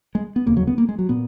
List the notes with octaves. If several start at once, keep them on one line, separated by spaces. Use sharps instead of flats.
G#3
B3
F1 D#2 C#3 A#3
F#3
B3
A#3
G#3
F#3
A#2 B3